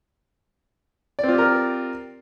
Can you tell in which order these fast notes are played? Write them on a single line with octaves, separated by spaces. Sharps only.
D5 C4 F4 G4 A#4